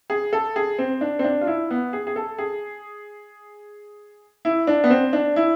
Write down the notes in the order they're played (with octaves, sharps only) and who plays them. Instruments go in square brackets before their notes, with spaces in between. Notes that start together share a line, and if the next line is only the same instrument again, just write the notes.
[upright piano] G#4
A4
G#4
C4
D4
C4
D4
F4
E4
B3
G#4
G#4
A4
G#4
E4
D4
B3
C4
D4
E4